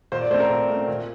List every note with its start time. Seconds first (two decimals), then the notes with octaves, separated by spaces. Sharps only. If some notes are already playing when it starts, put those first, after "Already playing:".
0.12 A#2 C5
0.21 D5
0.30 A3 C4 C5
0.40 A#4
0.50 A#2
0.68 A3 C4
0.88 A#2